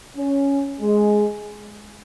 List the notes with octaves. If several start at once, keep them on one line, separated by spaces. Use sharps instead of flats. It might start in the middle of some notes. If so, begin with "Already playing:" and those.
C#4
G#3